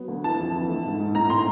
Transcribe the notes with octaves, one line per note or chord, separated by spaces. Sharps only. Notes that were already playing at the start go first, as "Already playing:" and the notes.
Already playing: F#3 B3
D2
E3 A5
F2
E3
A3
G#2
G#2
A2 A#5
A2 C6